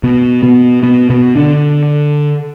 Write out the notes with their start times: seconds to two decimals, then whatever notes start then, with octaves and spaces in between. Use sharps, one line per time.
0.03 B2 B3
0.42 B2 B3
0.83 B2 B3
1.10 B2 B3
1.36 D3 D4